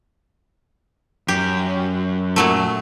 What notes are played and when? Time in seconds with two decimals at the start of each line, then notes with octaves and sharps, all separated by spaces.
1.28 F#2 G4
2.36 A#2 F#3 A3